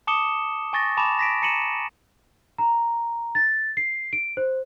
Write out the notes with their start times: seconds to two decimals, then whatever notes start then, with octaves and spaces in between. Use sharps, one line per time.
0.07 A5 D6 D#6 C#7 E7 G7
0.73 G#5 C#6 A6 A#6
0.97 G#5 A5 B5 D6 E7 F7
1.19 A#6 B6 D7
1.42 A#5 C#7 D#7 E7 F#7
2.58 A#5
3.35 A6
3.77 C7
4.13 D7
4.37 C5